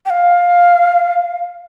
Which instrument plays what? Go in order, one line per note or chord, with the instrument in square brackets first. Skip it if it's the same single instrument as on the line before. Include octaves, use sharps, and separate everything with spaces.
[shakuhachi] G5
F5